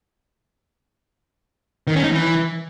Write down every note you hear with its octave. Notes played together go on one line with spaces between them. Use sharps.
D#3
C#4
D#4
E3